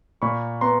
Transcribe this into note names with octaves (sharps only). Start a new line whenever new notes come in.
A#2 B5 C#6
B3 A#5 C6